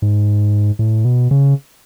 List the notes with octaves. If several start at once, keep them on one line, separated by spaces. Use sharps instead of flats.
G#2
A2
B2
C#3